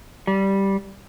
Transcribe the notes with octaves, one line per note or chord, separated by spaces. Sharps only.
G3